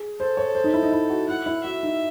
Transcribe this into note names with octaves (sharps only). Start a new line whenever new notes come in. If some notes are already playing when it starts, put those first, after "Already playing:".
Already playing: G#4
A4 C5
C#5
C5
D#4
E4
D#4
E4
F#4
E4 F#5
E4
F#4 E5
D#4